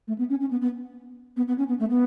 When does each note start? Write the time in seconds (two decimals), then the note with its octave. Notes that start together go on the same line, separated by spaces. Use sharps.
0.08 A3
0.18 B3
0.30 C#4
0.40 C#4
0.51 B3
0.61 B3
1.37 B3
1.48 B3
1.58 C#4
1.68 B3
1.80 A3
1.90 B3